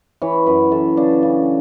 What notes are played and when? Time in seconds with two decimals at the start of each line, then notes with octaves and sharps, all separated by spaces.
0.22 E3 C#5
0.46 F#2 B4
0.72 E3 A4
0.97 C#3 D4
1.23 C#3